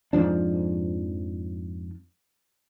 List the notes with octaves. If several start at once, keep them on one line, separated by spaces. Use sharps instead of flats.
F2 G#2 F3 D4